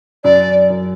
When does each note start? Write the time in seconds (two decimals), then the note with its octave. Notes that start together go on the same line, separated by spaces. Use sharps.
0.24 F#2 D5
0.70 F#2